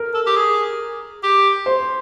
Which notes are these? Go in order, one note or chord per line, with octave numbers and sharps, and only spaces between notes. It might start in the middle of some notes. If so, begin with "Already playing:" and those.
Already playing: A#4
A4
G4
G#4
G4
C5